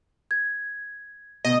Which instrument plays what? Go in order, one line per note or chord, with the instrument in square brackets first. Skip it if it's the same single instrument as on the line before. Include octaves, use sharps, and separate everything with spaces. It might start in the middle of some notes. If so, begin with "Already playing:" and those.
[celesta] G#6
[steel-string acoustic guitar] D2 B2 [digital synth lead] D#5